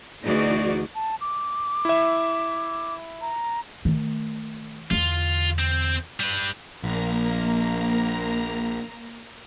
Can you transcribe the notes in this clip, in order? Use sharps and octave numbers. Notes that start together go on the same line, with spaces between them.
D2 E3 D#4 F#4 G#4 D5
A5
D6
E4 E5
A#5
D#3 A3
E2 D3 F4
C4
G3 B4
A#1 A#3 A#5